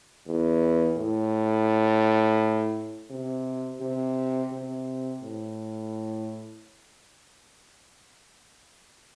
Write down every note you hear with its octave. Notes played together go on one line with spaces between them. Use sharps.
E2
A2
C3
C3
C3
A2